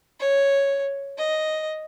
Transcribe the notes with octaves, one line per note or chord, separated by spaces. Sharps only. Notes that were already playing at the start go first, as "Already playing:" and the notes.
C#5
D#5